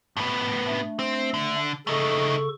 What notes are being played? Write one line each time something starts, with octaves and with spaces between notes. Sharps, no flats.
A2 B3
A3 D4
C4
D3
C#3 A3 D#4 A4 C#6